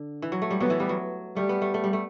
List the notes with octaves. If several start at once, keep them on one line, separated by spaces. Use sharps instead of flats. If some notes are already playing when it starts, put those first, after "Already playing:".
Already playing: D3
E3
F#3
A3
G3
F#3 B3
E3
G3
F#3
G3 A3
B3
A3
A3
G3
A3